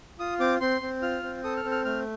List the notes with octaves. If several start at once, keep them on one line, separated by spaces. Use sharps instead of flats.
F4 D#6
C4 D6
C4 C6
C4
F4 F6
C4
A4 D#6
F6
C4
F6
A3 F6